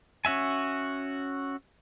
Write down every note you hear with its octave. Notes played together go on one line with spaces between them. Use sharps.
C#4 F#4 E5 G#5